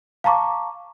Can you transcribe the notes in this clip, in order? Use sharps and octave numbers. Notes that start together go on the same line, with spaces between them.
F5 A5 A#5 C#6 D6